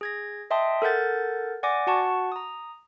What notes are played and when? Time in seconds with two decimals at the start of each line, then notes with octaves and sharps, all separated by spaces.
0.01 G#4 G#6 A#6
0.50 D#5 E5 G5 A5 C6 D#6
0.82 A4 A#4 F#5 G6 A6
1.63 D5 F#5 G#5 D6 A#6
1.87 F#4 F#5 A5 C#6
2.32 A#5 D#6